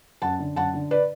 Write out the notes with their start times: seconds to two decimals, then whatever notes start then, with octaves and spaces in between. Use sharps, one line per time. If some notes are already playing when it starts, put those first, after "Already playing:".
0.22 F#2 F#5 A5
0.39 D3
0.56 F#2 F#5 A5
0.74 D3
0.91 B4 D5